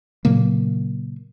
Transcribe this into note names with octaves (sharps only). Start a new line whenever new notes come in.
A#2 C#3 F#3 A#3